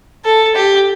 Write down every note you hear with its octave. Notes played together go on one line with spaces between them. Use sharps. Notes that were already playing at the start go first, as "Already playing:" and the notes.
A4
G4